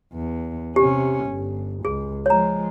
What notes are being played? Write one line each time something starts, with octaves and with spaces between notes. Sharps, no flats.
E2
C3 C#4 G4
G1
C#2 G#4
F3 G#3 C#5 A#5